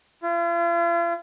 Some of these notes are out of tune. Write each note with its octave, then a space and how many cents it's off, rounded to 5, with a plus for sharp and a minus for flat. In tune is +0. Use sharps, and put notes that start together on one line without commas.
F4 -45